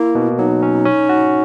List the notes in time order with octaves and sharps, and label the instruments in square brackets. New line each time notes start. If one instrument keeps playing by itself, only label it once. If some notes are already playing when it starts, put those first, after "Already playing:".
Already playing: [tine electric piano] A#3 [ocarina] E4
[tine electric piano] B2
[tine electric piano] F#3 [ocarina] D#4
[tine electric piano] C#4
C#4
F#4